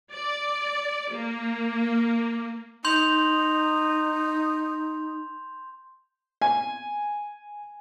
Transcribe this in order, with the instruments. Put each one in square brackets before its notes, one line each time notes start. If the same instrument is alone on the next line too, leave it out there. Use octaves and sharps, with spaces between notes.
[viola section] D5
A#3
[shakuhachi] D#4 [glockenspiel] C6 G6 F7
[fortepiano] G#5